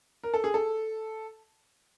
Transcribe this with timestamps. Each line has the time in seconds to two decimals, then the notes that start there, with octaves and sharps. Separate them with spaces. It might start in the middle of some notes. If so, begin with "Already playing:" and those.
0.24 A#4
0.34 A4
0.44 G#4
0.54 A4